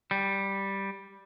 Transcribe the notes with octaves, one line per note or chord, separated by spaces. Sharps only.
G3